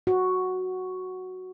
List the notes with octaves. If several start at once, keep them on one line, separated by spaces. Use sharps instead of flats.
F#4